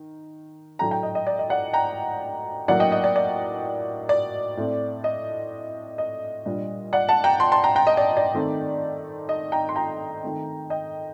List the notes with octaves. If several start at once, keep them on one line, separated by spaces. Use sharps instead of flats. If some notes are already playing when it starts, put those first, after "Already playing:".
Already playing: D#3
A2 F#3 A3 D4 G5 A#5
G5 A#5
D#5
D#5
D5
D#5
D5 F#5
G5 A#5
A2 F#3 A#3 D4 D5 F#5
D#5 G5
D#5
D5
D5
D5
A2 A3 C4
D#5
D#5
A#2 G3 D4
D5 F#5
F#5 A5
G5 A#5
A5 C6
A5 C6
G5 A#5
G5 A#5
D#5
D5
D5
D#3 A3 C4
D#5
G5 A#5
C6
G5 A#5
D#3 A3 C4
D#5 G5